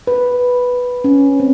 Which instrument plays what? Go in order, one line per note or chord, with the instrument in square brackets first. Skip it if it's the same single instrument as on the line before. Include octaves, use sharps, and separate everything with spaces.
[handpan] B4
C#4
C4